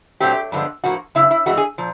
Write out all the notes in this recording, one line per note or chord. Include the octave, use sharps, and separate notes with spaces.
A#2 F#3 A3 C4 G4
G2 D3 F3 G#3 B3
A2 F3 A#3 F#4
F#2 C#3 E4
E4
G2 E3 G#3 B3 F#4
G#4
A#2 F3